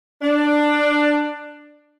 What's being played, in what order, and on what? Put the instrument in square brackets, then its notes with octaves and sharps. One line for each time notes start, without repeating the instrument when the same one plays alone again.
[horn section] D4